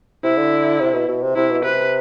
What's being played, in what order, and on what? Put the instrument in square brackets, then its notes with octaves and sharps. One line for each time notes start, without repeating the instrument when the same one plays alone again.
[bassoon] C3 [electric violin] E4
[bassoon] D3
C3
B2
B2
C3
[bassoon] C3 [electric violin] E4
[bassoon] B2
[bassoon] C3 [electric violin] B4